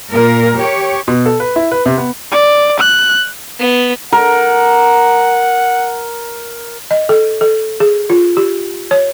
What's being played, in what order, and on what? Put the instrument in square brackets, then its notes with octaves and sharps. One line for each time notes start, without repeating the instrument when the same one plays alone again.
[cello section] A#2 A#4
G4 C#5
[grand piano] B2
A4
B4
E4
B4
C3
B3
[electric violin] D5
F#6
[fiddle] B3
[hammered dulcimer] A#4 [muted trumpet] F#5
[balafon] D#5
A4
A4
G#4
F4
G4
C#5